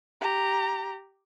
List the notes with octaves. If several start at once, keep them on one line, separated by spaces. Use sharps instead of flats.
G4 A#5